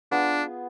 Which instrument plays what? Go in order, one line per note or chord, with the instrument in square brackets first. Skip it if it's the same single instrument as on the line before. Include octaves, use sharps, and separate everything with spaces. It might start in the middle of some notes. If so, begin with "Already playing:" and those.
[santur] B3 F4 G#4 [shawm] D4